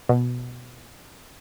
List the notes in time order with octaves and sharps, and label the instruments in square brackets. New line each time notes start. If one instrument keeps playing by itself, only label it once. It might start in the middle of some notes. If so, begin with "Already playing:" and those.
[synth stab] B2